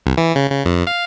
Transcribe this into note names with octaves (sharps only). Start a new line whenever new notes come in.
C2
E3
C#3
C#3
F2
F5